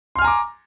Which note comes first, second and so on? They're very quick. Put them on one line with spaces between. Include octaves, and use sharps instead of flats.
C6 F6 G#5 A#5 D6